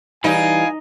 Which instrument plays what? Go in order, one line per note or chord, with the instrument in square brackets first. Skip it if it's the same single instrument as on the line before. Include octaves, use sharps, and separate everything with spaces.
[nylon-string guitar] E3 G3 [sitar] D#4 [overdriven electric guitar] F5 B5 [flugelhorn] G#5